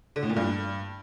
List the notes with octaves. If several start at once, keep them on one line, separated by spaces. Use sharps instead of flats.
D3
A2
A#2
G2